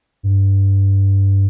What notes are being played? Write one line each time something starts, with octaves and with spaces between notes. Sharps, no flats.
G2